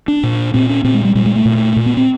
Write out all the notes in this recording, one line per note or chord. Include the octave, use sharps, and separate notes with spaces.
D4
A#2
A#2 C4
C#4
A#2 C4
G#3
G3
A#2 G3
G#3
A3
A#2
A#2
B3
C4